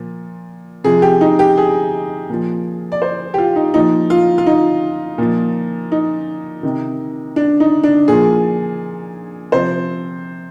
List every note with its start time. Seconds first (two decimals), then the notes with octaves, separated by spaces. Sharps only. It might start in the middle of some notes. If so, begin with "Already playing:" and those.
Already playing: A#2 F3
0.84 C3 F3 G#4
1.02 G4
1.21 D#4
1.39 G4
1.58 G#4
2.29 A#2 F3
2.92 D5
3.02 C5
3.34 G4
3.38 F4
3.56 D#4
3.74 A#2 F3 D#4
4.10 F4
4.38 F4
4.46 D#4
5.18 A#2 F3
5.92 D#4
6.63 C3 D#3
7.36 D4
7.60 D#4
7.83 D4
8.08 A#2 F3 G#4
9.52 C3 F3 C5